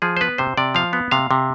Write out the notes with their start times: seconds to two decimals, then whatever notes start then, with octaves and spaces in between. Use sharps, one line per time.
0.02 F3 G#4
0.17 C5
0.21 B3 B4
0.38 C3 C5
0.58 C3 D5
0.75 F3 F5
0.93 B3
1.11 C3 F5
1.31 C3